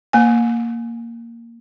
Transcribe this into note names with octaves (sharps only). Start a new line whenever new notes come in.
A#3 G#5